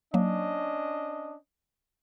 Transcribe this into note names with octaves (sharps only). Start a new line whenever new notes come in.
F#3 A#3 C#4 D4 D#5